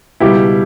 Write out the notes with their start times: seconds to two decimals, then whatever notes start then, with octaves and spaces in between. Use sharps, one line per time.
0.20 C#2 B2 G3 E4 G4